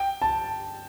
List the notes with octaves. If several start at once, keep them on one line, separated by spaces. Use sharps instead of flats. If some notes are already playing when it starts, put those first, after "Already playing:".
Already playing: G5
A5